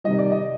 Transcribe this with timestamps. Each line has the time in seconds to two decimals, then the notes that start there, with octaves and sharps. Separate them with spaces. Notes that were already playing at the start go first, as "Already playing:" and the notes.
0.04 C3 D#3 G3 D#5
0.18 D5
0.32 D#5